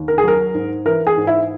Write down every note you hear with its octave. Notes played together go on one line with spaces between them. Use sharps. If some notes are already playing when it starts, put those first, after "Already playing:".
Already playing: D#2
A#4
G#4
F#3 A#4
G#2
E3 A#4
G#4
G#2
E4